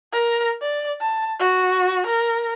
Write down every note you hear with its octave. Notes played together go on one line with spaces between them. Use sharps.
A#4
D5
A5
F#4
A#4